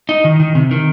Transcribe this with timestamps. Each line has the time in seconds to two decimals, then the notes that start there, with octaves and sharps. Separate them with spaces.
0.09 D#4
0.24 D#3
0.40 D#3
0.55 C3
0.71 D#3